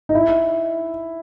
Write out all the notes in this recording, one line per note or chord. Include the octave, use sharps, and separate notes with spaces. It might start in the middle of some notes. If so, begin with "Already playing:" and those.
D#4
E4